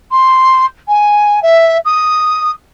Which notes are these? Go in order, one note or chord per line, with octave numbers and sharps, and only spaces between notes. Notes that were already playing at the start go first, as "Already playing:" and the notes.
C6
G#5
E5
D#6